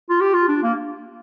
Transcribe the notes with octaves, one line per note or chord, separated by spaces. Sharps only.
F4
G4
F4
D4
A#3